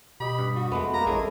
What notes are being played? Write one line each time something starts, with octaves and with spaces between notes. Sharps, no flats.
B2 G4 D#5 B5
G2
F#4
F2 G#3 A3 B3 B4
A#3 A#5
A1 G#3 C#4 E4 G#4 A4